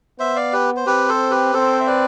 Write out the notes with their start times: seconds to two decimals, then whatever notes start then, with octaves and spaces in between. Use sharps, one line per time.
0.19 B3 C5 E5
0.36 D5 F5
0.53 G4 B4
0.76 C5
0.86 C4 G4 B4
1.08 A4 C5
1.31 G4 B4
1.53 C4 A4 C5
1.80 E5
1.87 B4 D5